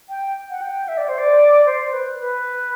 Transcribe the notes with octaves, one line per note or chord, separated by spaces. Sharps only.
G5
F#5
G5
E5
D5
C5
D5
C5
B4
B4